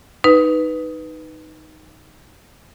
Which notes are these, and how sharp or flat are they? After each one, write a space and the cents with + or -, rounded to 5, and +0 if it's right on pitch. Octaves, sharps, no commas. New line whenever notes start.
D#4 +0 B4 +0